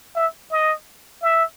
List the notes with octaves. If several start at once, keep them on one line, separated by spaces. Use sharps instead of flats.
E5
D#5
E5